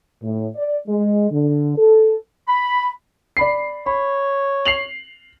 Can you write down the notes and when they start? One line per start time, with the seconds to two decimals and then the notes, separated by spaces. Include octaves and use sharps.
0.22 A2
0.56 D5
0.87 G#3
1.31 D3
1.77 A4
2.47 B5
3.37 D5 B5 C7
3.86 C#5 B5
4.65 C7 F7 F#7